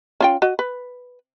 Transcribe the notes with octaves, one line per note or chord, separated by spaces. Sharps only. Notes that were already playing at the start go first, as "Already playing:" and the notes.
C#4 F4 G5
F#4 D#5
B4